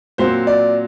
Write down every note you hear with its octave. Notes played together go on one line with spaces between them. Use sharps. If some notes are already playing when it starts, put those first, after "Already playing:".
A#2 F#3 C4 C5
D5